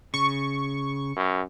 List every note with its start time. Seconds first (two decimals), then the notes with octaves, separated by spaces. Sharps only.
0.14 C#3 C#6
1.16 F#2